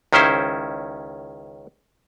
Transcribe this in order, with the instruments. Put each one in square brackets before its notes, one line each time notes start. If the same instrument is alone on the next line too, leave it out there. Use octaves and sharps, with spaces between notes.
[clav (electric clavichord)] C#2 D#3 C#4 E4 C5